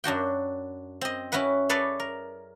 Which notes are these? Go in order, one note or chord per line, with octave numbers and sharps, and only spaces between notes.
F#2 D4 F#4 G5
C4 D#5
C#4 E4 F#4 B4 F#5
G#4 A4 B4 C#5 D5
A#4